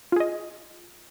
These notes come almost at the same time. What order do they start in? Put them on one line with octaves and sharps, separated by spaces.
F4 G#4 D#5